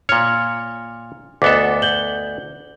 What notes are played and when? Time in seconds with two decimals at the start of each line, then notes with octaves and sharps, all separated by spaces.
0.09 A#2 C#5 F6
1.42 D2 B3 A4 D#5 D6
1.82 G6 F#7 G7